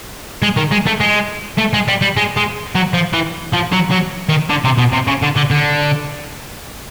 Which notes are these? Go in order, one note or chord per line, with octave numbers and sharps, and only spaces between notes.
G#3
D#3
G#3
A3
G#3
A3
G#3
G3
G3
G#3
G#3
F#3
F3
E3
F3
F#3
F#3
D#3
D3
C3
B2
C3
C#3
D3
D3
D3